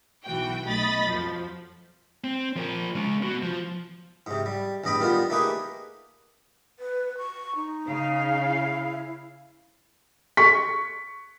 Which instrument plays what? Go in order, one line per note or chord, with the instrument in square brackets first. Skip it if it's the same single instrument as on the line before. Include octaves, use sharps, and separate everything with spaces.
[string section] B1 E3 F#4 G5
B1 A3 D#5 B5 A6
F2 F3 F#3
[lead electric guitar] C4
F3 A#4
G#3 C#4
B3 F#4
F3
[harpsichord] G#2 C3
G3
A1 E2 G2 D#5 G5 B5
D#3 G3 B3 F4 C5
A3 A#3 D#4 G4 G#4 B4
[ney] B4
C#6
D#4
[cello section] C#3 F5
[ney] E4
[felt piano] C#6 B6